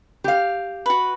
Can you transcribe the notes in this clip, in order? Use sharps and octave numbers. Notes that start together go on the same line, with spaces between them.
G4 F5
F#4 B4